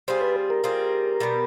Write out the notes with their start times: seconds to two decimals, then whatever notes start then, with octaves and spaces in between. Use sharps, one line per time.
0.08 G3 C4 F4 G#4 C5
0.21 B4
0.50 A#4
0.64 G3 C4 F4 G#4
1.20 B2 G3 B3